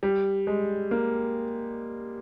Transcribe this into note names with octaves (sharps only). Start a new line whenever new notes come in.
G3
G#3
A#3